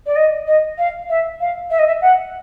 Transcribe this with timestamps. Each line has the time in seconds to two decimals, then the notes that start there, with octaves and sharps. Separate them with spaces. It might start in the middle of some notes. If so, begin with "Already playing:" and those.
0.06 D5
0.16 D#5
0.47 D#5
0.78 F5
1.09 E5
1.40 F5
1.70 E5
1.79 D#5
1.87 E5
2.01 F#5